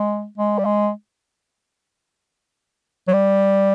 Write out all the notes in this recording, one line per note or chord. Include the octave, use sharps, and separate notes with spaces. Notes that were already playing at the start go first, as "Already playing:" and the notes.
Already playing: G#3
G#3
G3
G#3
F#3
G3